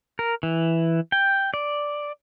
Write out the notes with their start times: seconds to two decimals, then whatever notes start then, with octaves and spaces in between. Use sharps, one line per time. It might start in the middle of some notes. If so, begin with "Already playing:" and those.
0.19 A#4
0.43 E3
1.12 G5
1.54 D5